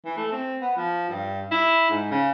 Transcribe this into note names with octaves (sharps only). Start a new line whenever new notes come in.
E3
A3
C4
B3
F3
G2
E4
G#2
C#3